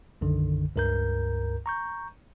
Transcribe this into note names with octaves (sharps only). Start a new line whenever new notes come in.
B1 F#2 D3 D#3
C#2 G2 A#4 A#5 G6
A#5 C#6 G6